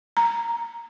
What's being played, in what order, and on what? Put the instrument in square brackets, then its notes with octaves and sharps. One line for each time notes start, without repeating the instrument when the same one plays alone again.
[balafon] A#5